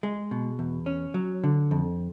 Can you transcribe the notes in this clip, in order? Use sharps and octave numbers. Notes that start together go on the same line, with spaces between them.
G#3
B2
E2
C#4
F#3
D3
F2